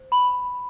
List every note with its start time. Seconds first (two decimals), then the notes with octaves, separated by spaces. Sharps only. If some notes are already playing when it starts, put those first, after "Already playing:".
Already playing: C5
0.12 B5